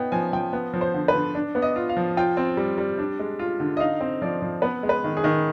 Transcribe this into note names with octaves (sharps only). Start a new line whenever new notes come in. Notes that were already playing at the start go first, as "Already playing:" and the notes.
Already playing: B3 D#4 G5
F3 G#5
F3 G5
B3
F3
C5
D3
B4
D3
D4
B3
D#5
F4
F5
F3
F4 G5
C4
G3
G3
D4
G#3
F4
D3
D#5
D#4 F5
C4
F3 D5
F3
B3 B4
G#3
B4
D#3
G#4
D#3